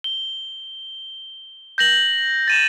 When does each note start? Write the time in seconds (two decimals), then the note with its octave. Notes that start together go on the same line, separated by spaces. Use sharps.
0.04 G7
1.78 G6 A#6 F#7
2.48 A6 D#7 E7